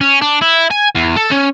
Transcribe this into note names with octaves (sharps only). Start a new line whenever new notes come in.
C#4
D4
E4
G#5
E2
A4
C#4